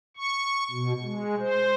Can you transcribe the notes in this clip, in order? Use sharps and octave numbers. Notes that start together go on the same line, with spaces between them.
C#6
B2
G#3
C5